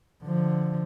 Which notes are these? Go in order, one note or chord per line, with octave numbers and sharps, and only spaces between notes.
D3 F3